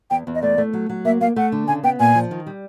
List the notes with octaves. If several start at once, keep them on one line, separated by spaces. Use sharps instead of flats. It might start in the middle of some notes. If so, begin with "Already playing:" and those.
E2 G5
E2
D#5
A3 D5
A3
F#3
F#3
A#3 E5
A#3 F5
A3 F#5
D3
C#3 G#5
B3 G5
A#2 G#5
F3
D#3
G3